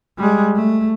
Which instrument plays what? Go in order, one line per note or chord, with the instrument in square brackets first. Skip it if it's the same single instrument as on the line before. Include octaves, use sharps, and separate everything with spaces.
[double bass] G3 G#3
A3